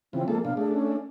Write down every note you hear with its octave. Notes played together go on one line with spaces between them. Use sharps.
C#3 E3 F3 C4
F3 G#3 A#3 A4
B2 D4 F5
A3 D4 G#4
C#4